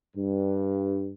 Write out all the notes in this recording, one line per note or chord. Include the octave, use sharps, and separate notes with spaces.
G2